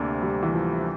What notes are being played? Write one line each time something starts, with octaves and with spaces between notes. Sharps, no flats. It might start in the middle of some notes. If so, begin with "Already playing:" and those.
Already playing: D2 C3 A#3 D4
G3
E3
F3